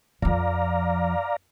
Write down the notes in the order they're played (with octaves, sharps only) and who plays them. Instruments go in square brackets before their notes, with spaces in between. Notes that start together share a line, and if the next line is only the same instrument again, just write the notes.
[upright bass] F2 F3 [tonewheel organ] D5 F5 A#5